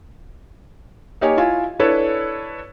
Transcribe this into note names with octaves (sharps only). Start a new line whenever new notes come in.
A#3 D#4 G4 C#5 G#5
E4 F4 G#5
D4 E4 A4 B4 C#5